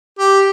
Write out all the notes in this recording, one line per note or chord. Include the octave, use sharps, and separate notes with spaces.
G4